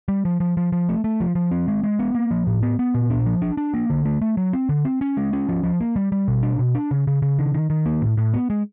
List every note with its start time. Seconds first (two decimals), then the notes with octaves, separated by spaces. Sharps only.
0.08 G3
0.25 F3
0.40 F3
0.57 F3
0.72 F3
0.89 A3
1.04 A3
1.21 F3
1.35 F3
1.51 C4
1.68 G#3
1.84 G#3
1.99 B3
2.15 A#3
2.31 F3
2.47 A2
2.63 B3
2.79 B3
2.95 A#2
3.10 D4
3.26 F3
3.42 D4
3.57 D4
3.74 A#3
3.90 D3
4.05 A3
4.22 A3
4.37 F#3
4.53 C4
4.69 D3
4.85 C4
5.01 C#4
5.17 G#3
5.33 C#4
5.49 F3
5.63 F3
5.80 A#3
5.96 G3
6.12 G3
6.28 B2
6.43 D4
6.59 B2
6.75 D4
6.91 C#3
7.07 C#3
7.22 C#3
7.39 D#3
7.54 D#3
7.70 D#3
7.86 A#3
8.02 A2
8.17 A2
8.34 B3
8.50 G#3